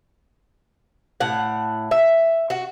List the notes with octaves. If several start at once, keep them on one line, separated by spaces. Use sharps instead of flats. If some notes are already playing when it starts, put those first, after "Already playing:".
A2 F#5
E5
F#4